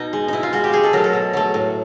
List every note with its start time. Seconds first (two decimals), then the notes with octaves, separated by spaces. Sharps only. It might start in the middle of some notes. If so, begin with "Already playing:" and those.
Already playing: B2 D#4
0.13 G#3
0.28 B2 D#4 E4
0.43 F4
0.53 G#3 F#4
0.64 G4
0.73 B2 G#4
0.83 A4
0.93 F#3 A3 A#4
1.04 A4
1.13 B2
1.33 F#3 A3
1.54 A2